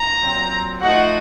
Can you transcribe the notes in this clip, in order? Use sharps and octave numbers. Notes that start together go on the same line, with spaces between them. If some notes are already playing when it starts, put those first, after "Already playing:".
Already playing: A#5
A#2 F#3 C4
F3 A3 D#4 F#4 F#5